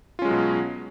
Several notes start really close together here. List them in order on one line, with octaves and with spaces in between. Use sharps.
F4 C#4 G#3 F#3 B2